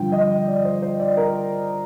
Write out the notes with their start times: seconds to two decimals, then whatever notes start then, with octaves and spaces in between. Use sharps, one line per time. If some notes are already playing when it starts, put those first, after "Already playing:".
Already playing: G2 D3 F3 G5
0.12 D#5
0.47 D5
0.65 C5
0.82 C5
1.00 D5
1.17 A#4